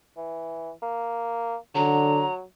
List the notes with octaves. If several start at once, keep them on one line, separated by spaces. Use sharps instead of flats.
E3
A#3
D3 F#3 A#5